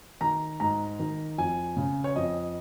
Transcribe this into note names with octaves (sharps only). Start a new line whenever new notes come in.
D#3 A#5
G#2 A#5
D#3
F2 G#5
C#3
C#5
F2 D#5